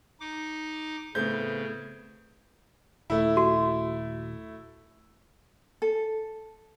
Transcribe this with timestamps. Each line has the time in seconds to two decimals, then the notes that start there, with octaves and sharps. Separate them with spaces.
0.20 D#4 D6
1.15 A2 C#3 B3 C4 G6
3.10 D#1 A3 E4
3.37 F#4
5.82 A4